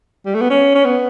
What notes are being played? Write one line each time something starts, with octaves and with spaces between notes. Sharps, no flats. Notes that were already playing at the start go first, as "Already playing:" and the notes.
G3
A3
B3
C#4
C#4
B3